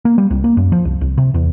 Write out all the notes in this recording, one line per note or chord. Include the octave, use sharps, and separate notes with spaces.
A#3
G3
C2
A#3
F#2
F3
C2
C2
C3
E2